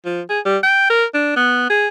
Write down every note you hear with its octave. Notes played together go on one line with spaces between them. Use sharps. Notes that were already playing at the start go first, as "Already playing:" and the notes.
F3
G#4
G3
G5
A#4
D4
B3
G#4